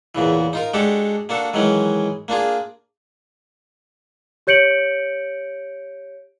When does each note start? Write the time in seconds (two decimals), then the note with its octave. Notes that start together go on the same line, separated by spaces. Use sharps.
0.15 E2 A#2 C#3 E3
0.53 D#4 F4 A#4
0.74 G#3 D4 F#4 G4 A4
1.29 A#3 D4 F#4 A4
1.54 D#3 E3 F#3 G#3 C#4
2.28 A#3 D4 F4 G#4
4.47 G4 C#5 G6 C#7 D7 F#7